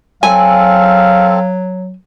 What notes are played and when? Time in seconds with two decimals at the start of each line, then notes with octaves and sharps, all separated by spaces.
0.23 F#3 C4 A4 F5 G#5